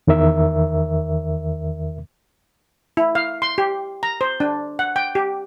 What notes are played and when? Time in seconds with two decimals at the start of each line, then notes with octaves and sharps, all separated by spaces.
0.07 E2 D#3 A#4 E5
2.97 E4
3.15 F5
3.42 C6
3.58 G4
4.03 A#5
4.21 C5
4.40 D4
4.79 F#5
4.96 G5
5.15 G4